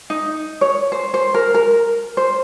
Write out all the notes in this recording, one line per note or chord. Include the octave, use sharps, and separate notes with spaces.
D#4
C#5
C5
C5
A#4
A#4
C5